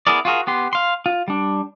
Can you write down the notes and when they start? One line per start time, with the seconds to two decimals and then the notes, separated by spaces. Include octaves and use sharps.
0.07 B3 E4 G#4 A#4 D5
0.25 F4 F#4 G#4 A#4
0.47 B3 G4 C6
0.73 F5 C6
1.06 F4
1.28 G3 D4